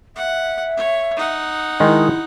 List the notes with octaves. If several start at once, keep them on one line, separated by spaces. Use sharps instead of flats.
E5 F#5
C#5
D#4 F#5
D#3 G#3 E4